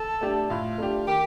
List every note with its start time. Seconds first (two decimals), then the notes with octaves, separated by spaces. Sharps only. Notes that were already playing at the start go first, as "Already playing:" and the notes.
Already playing: A4
0.21 A3 D4 G4
0.50 A2 F4
0.78 A3 D4 G4
1.07 D#3 G4